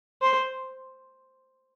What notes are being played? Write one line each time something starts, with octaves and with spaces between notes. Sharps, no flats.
C5